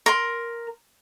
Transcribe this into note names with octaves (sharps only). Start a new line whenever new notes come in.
A#4 C6